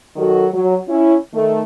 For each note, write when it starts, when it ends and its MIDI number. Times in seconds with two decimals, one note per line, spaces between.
0.16 0.47 51
0.16 0.47 54
0.16 0.47 66
0.16 0.47 69
0.16 0.47 70
0.53 0.77 54
0.88 1.16 61
0.88 1.16 64
1.34 1.62 51
1.34 1.62 57